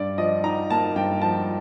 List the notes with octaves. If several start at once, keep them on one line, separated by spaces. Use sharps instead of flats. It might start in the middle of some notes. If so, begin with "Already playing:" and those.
Already playing: G2 D5
F3 D#5
D#4 A#5
A#3 A5
G2 G5
F3 A5